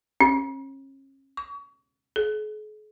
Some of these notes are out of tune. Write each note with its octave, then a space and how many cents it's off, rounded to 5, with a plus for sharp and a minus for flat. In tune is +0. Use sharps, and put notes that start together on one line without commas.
C#4 -35
C#6 +30
G#4 +45